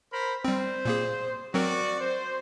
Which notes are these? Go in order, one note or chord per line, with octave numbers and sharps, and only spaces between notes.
A#4 C5 B5
G3 C4 C5
A#2 A#3 G#4
F#3 C4 F#4 A#4 D5 C#6
C5